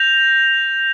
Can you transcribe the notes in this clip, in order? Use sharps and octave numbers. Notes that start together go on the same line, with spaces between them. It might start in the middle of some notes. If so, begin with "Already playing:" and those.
Already playing: G6 A#6 F7